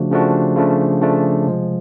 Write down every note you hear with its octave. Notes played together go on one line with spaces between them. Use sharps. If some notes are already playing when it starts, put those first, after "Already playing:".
Already playing: C#3 F3 A3 D4 F#4
C#3 F3 A3 D4 F#4
C#3 F3 A3 D4
C#3 F3 A3 D4
C3 F3 G#3